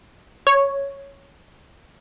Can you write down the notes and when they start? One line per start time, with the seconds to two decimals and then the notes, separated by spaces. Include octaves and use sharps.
0.47 C#5